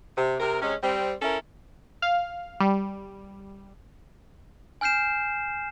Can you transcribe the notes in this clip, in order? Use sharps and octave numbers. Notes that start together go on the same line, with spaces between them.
C3
C3 A#4
C3 G#3 C#4
G3 C4
C#4 E4 A4 A#4
F5
G3
G#5 F6 G6 C7 E7